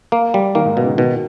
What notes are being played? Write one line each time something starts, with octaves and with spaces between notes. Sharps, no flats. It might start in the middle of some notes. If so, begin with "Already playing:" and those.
A#3
G3
D#3 A#3
G#2
B2
C#3
D#3
B2 D#3